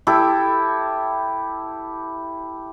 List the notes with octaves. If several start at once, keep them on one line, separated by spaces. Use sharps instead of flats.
E4 G4 A4